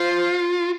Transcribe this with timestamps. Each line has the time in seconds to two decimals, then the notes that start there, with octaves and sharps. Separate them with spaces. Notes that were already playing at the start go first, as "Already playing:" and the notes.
Already playing: F4 C5